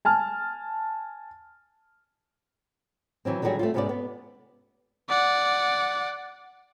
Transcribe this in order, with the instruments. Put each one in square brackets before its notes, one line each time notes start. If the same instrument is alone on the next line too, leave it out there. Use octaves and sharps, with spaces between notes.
[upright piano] G#5 A5 F6
[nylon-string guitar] D#3 E3 F#3 C4
D3 D#3 F#3 G3 F#4 G#4
A3 C4 F4
G#2 C3 G#3 B3 C#4 D5
B3
[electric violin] D5 F#5